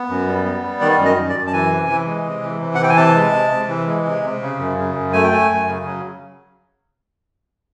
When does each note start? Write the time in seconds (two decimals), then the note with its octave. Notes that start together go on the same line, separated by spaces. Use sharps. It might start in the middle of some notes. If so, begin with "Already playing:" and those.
Already playing: B3
0.09 F#2
0.27 G3
0.45 B3
0.63 G3
0.81 D#3 D5
0.98 F#2
1.05 D#5
1.17 F#2
1.29 D5
1.35 F#2
1.47 A5
1.53 E3 G#5
1.72 C3
1.89 E3
2.07 G#3
2.26 C3
2.43 E3
2.61 C3
2.75 F#5
2.80 E3 G5
2.90 G#5
2.97 C3 A5
3.15 G#3
3.33 C3
3.51 C3
3.68 E3
3.86 G#3
4.05 C3
4.23 C3
4.41 C#3
4.59 F#2
4.78 C#3
4.95 F#2
5.13 A3 G#5
5.24 G5
5.31 A3 G#5
5.50 F#2
5.67 C#3
5.86 F#3